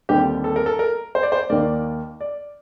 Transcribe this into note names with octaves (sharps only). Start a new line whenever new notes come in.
D#2 D3 G3 C4 G4
A4
A#4
A4
A#4
C5
D5
C5
D#2 D#3 A#3 D5
D5